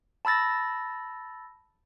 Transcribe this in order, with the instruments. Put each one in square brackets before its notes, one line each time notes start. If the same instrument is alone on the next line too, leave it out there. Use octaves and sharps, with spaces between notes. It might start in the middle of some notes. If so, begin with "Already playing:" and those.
[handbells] A5 B5 E6 A6 A#6